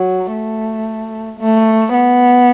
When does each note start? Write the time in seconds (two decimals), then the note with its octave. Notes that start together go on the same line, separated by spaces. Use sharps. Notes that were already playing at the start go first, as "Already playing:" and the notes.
Already playing: F#3
0.31 A3
1.39 A3
1.93 B3